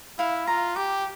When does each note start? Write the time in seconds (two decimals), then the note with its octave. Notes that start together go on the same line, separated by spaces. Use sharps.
0.18 E4 F5
0.47 F4 A#5
0.76 G4 D6